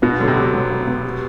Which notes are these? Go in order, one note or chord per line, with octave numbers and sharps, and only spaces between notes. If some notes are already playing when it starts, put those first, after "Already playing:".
B2 B3
D3 F#3
C3
F#3
F#3
B3
B3
G4